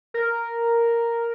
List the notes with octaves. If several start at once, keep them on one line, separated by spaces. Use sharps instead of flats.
A#4